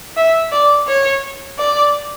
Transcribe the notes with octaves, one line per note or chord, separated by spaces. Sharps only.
E5
D5
C#5
D5